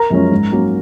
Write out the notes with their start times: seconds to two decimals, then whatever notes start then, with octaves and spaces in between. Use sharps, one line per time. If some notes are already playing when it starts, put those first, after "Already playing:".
Already playing: A#4 A#5
0.10 F#2 F3 G#3 C#4
0.32 G#2
0.52 F#3 A#3 C#4